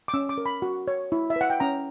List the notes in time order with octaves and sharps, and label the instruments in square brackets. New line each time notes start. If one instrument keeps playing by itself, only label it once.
[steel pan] D6
C#4 E6
D6
A#4
B5
F#4
C#5
E4
E5
B4 F#5
G5
C#4 A#5